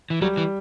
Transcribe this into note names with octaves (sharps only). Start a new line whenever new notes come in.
E3
F#3 G3
E3